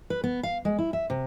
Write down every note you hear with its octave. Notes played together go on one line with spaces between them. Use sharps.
B4
B3
F5
G#3
E4
E5
C3